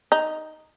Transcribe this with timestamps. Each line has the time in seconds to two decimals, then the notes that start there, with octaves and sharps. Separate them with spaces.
0.12 D#4